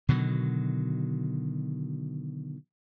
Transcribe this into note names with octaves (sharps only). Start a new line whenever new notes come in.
B2 D3 D#3 F#3